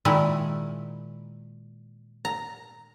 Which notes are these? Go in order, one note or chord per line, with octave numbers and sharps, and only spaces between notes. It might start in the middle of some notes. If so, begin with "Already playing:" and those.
A#2 D#3 G#3 E4
A#5